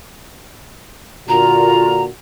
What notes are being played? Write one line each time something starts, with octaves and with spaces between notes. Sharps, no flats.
A#2 D3 F4 F#4 A#4 A#5